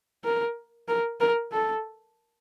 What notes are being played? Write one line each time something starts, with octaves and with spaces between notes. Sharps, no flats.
A#4
A#4
A#4
A4